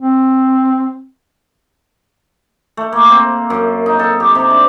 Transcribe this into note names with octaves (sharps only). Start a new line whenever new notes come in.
C4
A3
A#3
C4
F#2
D#4
A4
G4
C3
D4